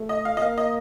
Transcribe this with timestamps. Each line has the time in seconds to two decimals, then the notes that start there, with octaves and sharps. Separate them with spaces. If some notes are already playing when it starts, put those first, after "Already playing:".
Already playing: A3
0.09 D#5
0.25 F5
0.37 D#5
0.41 A#3 F5
0.58 D#5